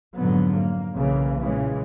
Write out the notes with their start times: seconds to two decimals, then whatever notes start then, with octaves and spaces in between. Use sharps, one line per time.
0.16 F2 G#2 B2 D3 F#3 B3
0.54 A#3
0.94 B1 C#3 E3 A#3
1.40 A#2 C#3 E3 G#3